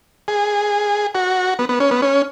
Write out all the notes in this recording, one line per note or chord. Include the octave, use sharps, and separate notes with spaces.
G#4
F#4
B3
B3
C#4
B3
C#4